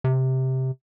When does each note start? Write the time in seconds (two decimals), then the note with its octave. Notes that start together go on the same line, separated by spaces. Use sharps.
0.04 C3